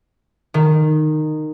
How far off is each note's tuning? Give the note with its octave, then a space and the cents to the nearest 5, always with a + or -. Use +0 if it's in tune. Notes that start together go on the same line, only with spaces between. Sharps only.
D#3 -15